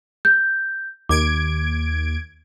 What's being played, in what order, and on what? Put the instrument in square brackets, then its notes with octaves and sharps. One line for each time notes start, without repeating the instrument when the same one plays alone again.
[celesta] G6
[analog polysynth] D#2 G#6 D7 [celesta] D6